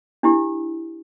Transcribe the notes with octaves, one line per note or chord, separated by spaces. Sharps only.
D4 E4 G4